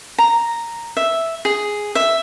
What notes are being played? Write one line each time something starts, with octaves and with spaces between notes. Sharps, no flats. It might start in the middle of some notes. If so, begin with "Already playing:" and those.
A#5
E5
G#4
E5